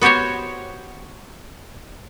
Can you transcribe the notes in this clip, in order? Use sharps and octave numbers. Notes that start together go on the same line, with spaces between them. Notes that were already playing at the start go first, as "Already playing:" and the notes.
B3 F#4 G4 C5 C#5